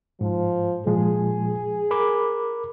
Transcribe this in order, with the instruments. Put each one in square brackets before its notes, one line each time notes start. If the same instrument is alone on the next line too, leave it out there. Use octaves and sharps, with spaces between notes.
[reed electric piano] G#2 [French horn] F3
[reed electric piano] A#2 F3 G#3 [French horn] G#4
[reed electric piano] A#4 B5 D6